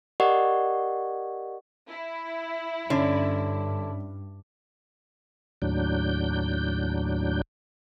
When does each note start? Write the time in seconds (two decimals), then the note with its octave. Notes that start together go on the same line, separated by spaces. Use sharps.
0.20 G4 A#4 D5 D#5 F#5 C#6
1.89 E4
2.90 G2 D3 C#4
5.62 D#2 A2 F#3 D4 G6